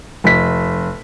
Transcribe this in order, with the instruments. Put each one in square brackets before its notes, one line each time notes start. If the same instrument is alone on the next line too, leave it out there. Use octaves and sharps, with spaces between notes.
[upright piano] F1 B6